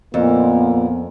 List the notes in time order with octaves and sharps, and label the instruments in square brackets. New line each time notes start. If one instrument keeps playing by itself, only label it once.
[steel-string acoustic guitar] F2 [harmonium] A#2 [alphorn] A#3 [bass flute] B3